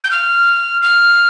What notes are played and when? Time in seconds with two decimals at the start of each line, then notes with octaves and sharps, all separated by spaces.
0.04 G6
0.11 F6
0.82 F6